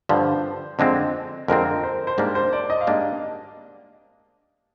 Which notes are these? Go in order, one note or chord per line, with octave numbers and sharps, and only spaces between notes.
G2 D3 F3 C5
F2 D3 G#3 C4
F2 D3 G#3 C4 A#4
C5
C5
G#2 G3 A#3 D4 A#4
C5
D5
D#5
F5
G#2 G3 A#3 D4 D#5